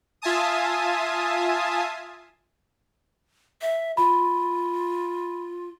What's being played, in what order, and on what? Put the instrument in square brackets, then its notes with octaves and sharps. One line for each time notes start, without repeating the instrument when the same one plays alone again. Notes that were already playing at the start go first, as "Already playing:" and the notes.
[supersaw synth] F4 E5 G#5 A5 D#6
[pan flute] E5
[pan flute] F4 [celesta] B5